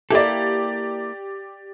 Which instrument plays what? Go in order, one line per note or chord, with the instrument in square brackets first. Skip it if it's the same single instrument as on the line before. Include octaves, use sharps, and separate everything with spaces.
[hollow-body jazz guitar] A#3 E4 A4 [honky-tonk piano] G4 D5